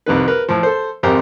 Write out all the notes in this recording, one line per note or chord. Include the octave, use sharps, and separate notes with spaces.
C2 F2 D#3 B4
A#4 B4
A2 F3
A4 C5
G#1 F2 G4 A#4 C5 A#5